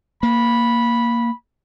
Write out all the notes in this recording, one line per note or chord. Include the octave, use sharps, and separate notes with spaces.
A#3 B5